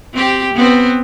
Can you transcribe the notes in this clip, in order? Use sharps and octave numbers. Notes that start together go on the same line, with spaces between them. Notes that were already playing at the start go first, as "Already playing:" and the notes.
C4 G4
B3 C4